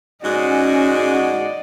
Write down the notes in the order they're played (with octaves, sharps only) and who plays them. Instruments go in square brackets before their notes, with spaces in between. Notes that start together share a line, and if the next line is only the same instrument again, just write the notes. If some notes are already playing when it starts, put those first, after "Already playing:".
[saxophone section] G#2 G#3 F#4 [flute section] C#4 [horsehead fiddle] D5 D#5